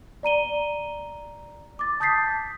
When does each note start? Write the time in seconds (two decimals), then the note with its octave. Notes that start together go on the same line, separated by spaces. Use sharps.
0.23 D5 A#5 D#7 G7
1.79 D6 A6
2.00 A5 D#6 G6 A6 B6 C7